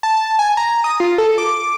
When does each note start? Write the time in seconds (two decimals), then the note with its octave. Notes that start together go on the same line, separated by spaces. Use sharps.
0.03 A5
0.39 G#5
0.57 A#5
0.84 D#6
1.00 F4
1.18 A4
1.38 D6